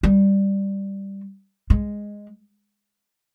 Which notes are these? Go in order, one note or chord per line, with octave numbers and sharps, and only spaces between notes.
G3
G#3